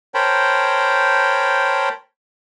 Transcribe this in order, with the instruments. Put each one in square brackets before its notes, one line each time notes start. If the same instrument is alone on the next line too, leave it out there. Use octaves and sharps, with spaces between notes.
[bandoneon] A#4 C5 C#5 G5 A5 B5